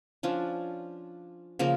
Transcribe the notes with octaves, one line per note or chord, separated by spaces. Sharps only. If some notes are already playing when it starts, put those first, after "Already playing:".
F3 C#4 D4
C#3 F3 A#3 A#4